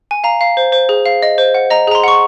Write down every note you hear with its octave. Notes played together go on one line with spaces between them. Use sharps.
G#5
F5 A#5
F5
C5
C5
G#4
F5
D#5
C5
F#5
D#5 A#5
G#4 A#5
C6
F#5 C#6